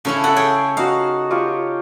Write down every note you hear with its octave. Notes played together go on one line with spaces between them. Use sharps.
C#3 C#4 E4 A4 C#5
A4 E5 F#5 E6
G#4 C#5 G5
D#4 F#4 F5
F4 G4 C#5